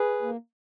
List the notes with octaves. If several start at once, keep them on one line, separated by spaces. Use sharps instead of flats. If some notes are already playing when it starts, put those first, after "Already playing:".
Already playing: G#4 B4
A#3